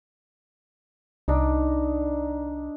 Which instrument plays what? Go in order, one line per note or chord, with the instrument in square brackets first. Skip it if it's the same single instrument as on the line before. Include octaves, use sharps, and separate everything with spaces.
[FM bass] C2 [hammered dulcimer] D4 D#4